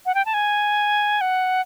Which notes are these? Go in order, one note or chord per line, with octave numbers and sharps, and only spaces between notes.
F#5
G5
A5
G#5
F#5